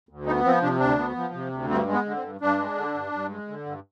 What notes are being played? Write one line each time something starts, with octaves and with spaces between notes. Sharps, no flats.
D2
B3 D#4
F3 C4
C3 D4
D2 D4
B3
F3
C3
D2
G2 C4
G#3
B3
D3
C4
G2
G2 D4
G#3
D3
G2
G2
G#3
D3
G2